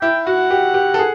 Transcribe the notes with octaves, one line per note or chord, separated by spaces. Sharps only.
E4 G5
F#4 F#5
G4
G4
A4
G#4